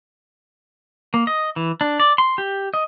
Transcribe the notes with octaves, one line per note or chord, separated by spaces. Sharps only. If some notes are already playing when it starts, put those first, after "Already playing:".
A#3
D#5
E3
D4
D5
C6
G4
D#5